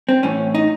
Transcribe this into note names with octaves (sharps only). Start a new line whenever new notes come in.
C4
A2 E3 C#4
D#4